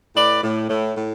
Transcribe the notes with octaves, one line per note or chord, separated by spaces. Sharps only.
A2 B4 D5
A2
A2
A2